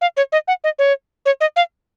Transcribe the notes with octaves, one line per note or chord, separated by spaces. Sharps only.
F5
C#5
D#5
F#5
D#5
C#5
C#5
D#5
F5